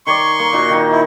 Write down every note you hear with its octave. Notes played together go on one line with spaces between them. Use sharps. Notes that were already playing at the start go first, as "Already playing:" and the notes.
D#3 C#5 D5 C6 C#6
A#3
A#2 D#4 F#4
D#3 D#4
E4